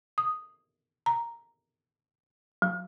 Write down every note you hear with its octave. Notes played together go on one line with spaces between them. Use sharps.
D#6
A#5
F#3